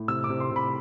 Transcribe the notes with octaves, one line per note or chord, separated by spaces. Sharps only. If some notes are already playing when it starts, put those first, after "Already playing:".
Already playing: A2
C3 E6
D6
C3
C6
C3 B5